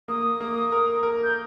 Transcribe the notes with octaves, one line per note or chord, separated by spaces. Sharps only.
A#3 D#6
A#3
A#4
A#4
G6